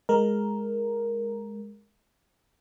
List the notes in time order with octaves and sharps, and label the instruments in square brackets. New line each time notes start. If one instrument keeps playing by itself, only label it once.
[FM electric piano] G#3 A#4